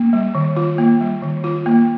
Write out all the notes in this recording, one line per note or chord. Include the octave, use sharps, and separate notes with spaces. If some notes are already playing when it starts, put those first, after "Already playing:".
Already playing: A#3
G3
D#3
F4
A#3
G3
D#3
F4
A#3